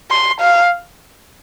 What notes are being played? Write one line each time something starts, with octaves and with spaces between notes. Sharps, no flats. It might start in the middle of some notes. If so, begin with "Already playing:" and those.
C6
F5